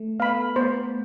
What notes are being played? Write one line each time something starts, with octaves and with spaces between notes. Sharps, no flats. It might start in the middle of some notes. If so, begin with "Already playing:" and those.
Already playing: A3
B3 F5 B5
B3 C5